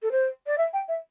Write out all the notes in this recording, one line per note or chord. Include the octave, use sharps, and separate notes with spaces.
A4
C5
D5
E5
G5
E5